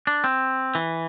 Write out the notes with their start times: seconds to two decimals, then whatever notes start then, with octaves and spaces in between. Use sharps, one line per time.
0.07 D4
0.24 C4
0.75 E3